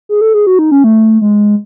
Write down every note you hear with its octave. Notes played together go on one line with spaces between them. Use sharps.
G#4
A4
G#4
F#4
D#4
C#4
A3
G#3